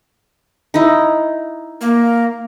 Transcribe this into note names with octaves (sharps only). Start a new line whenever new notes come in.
D#4 E4
A#3